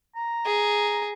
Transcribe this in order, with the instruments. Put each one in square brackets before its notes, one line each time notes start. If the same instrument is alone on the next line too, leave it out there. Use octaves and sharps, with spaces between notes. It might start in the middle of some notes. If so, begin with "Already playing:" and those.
[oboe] A#5
[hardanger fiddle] G#4